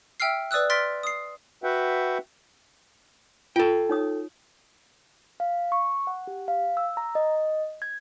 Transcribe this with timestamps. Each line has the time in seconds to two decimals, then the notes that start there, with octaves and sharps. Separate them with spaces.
0.20 E5 G5 E6 F6 C7
0.51 B4 D5 D#6 E6 F#6
0.70 C6 F6 A6 B6 D7
1.03 D#6 C7
1.63 F#4 B4 E5 F#5 G5
3.56 F4 A4 G5
3.89 D#4 C#5 D#6
5.40 F5
5.72 C#6
6.07 F#5
6.27 G4
6.48 F5
6.77 E6
6.97 A#5
7.15 D#5
7.82 G#6